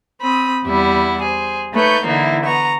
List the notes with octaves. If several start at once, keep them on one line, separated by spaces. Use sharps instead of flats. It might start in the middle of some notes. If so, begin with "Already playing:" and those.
C4 B5 D#6
E2 G3 E4 F#5
G#4 C5
A3 D#4 B4 C#5 G6
D3 E3 A#3 D#4 E4
B3 A#5 C#6